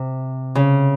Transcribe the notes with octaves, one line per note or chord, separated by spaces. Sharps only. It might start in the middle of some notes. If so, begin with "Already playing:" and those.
Already playing: C3
C#3